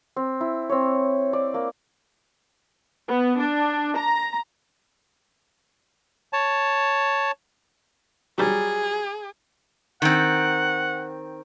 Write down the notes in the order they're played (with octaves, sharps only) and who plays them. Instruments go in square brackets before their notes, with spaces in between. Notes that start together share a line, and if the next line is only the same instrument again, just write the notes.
[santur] C4
E4
C4 C#5
D5
A#3
[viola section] B3
D4
A#5
[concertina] C#5 A5
[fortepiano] F#3 G3 [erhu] G#4
[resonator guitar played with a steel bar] D#3 C4 [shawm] F#5